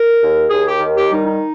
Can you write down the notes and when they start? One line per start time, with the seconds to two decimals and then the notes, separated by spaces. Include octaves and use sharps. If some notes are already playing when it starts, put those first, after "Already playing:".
Already playing: A#4
0.21 D#2
0.50 D#2 G#4
0.66 G4
0.80 D#3
0.95 G4
1.10 G3 D#4
1.25 D#4